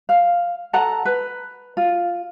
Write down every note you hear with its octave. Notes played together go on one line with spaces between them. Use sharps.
F5
A4 F#5 A#5
B4
F4